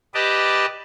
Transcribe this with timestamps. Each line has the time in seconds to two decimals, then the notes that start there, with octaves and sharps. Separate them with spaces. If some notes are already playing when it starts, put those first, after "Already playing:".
0.14 G4 B4 D5 D#5 A5